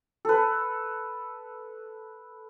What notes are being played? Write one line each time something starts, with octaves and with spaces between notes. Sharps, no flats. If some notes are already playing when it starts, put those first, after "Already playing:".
A4 B4